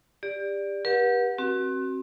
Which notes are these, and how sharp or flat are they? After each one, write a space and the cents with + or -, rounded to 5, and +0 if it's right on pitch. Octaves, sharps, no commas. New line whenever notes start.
G4 +30 D5 +0
G4 +0 B4 -40 F#5 -25
C4 +25 F#4 +20